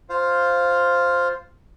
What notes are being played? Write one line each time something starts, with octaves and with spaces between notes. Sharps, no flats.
F4 C5 F5